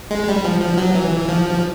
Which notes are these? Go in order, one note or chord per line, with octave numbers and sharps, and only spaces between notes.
G#3
G3
F3
F3
F#3
E3
F3